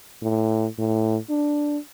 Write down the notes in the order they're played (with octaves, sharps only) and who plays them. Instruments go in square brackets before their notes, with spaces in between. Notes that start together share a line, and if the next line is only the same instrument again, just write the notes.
[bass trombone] A2
A2
D4